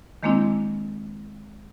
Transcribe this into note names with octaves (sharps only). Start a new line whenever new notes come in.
D#3 G#3 A#3 C4 D4 E4